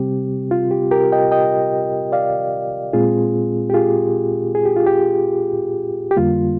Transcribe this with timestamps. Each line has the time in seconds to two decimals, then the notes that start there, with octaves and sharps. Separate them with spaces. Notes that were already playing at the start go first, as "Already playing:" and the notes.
Already playing: C3 G3 C4 G4
0.51 F4
0.71 G4
0.91 G4 A#4
1.12 D#5 G5
1.31 D#5 G5
2.12 D5 F5
2.93 A#2 G#3 C4 F4 G#4
3.70 G4
3.74 F4 G#4
4.55 G#4
4.65 G4
4.76 F4
4.87 G4
6.11 G4
6.17 F2 D3 G3 A#3 F4